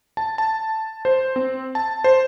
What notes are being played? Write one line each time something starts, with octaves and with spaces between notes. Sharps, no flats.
A5
A5
C5
C4
A5
C5